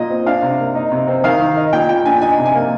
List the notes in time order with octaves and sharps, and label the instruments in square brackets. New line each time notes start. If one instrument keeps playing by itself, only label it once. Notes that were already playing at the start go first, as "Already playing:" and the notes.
Already playing: [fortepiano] A#2 D#4 D#5
C4
D4 F5
C3
A#3
D#4
C3
C4
D#3 F5
D#3
D#4
A#2 G5
A#2 G5
D4 G#5
D#4 G#5
C3
G#5
A#3